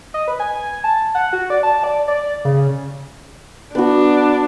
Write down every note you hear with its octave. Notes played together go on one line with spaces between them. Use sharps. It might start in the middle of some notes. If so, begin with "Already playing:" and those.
D#5
B4
G#5
A5
F#5
F#4
D5
A5
D5
D5
C#3
B3 D4 F#4